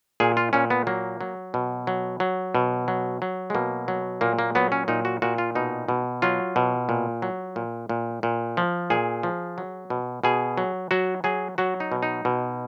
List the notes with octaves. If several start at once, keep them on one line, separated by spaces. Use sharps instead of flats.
A#2 G#4
F4
A#2 C#4
B3
F#3 A#3
F#3
B2
F#3
F#3
B2
F#3
F#3
G#3
B2 A#3
F#3
A#2 A#3
A#3
F#3 B3
C#4
A#2 D#4
F#4
A#2 F#4
F4
B2 D#4
B2
F#3 F4
B2
A#2
F#3
A#2
A#2
A#2
F3
A#2 G#4
F3
F#3
B2
B2 G#4
F#3
F#3 F#4
F#3 G#4
F#3 F#4
D#4
B2
D#4
B2